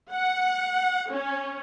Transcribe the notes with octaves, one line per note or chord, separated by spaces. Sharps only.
F#5
C#4